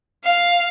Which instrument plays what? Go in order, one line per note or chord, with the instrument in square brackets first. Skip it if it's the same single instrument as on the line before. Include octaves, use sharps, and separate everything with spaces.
[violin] F5